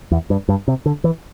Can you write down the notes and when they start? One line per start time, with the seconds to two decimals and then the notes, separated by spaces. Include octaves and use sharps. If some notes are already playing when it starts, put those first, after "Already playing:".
0.11 E2
0.30 G2
0.49 G2
0.68 C3
0.86 D3
1.04 E3